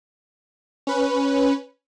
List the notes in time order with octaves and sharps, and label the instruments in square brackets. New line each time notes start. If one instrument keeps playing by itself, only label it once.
[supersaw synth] C#4 B4